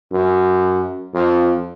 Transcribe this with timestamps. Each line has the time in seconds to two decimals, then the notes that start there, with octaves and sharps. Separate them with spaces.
0.12 F#2
1.14 F2